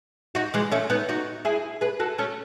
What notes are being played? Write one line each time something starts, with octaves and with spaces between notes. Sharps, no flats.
D#4 F#4
E3 G#3
A3 C#4
B3 D#4
D#4 F#4
E4 G#4
G#4 B4
F#4 A4
A3 C#4